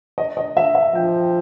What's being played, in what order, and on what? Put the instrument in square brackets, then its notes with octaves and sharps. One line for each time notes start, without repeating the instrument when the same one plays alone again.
[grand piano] D#5
D#5
E5
E5
[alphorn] F3 [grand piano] G5